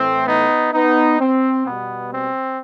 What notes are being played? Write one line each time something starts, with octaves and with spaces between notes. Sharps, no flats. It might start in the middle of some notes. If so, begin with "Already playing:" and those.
Already playing: A2 E3 A3 C4
B3 D#4
B3 D#4
C4
B2 G3 B3
C4